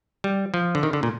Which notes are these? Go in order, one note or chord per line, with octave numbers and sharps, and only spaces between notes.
G3
F3
D3
D#3
D3
A#2